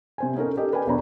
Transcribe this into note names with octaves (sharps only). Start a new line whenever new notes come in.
C3 C5 G#5
B3 C#4 D#4 A4 A#4
G4 A4 D#5
A#4 B4 D5 G5 G#5
B1 E2 D4 C#5 A#5 B5